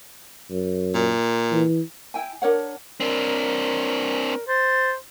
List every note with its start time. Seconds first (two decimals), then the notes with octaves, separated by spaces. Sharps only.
0.51 F#2
0.94 A#2
1.52 E3
2.14 E4 G5 G#5
2.42 D4 A#4 C#5 F#5
3.00 C4 D4 A#4
4.48 C5 A6